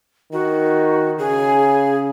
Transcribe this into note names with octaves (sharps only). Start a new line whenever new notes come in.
D#3 F#4
C#3 G#4